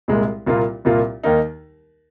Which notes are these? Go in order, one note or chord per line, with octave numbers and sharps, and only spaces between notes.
C2 A#2 G#3
C2 A#2 A#3 F4
C2 A#2 A#3 F4
D#2 D#3 A#3 D#4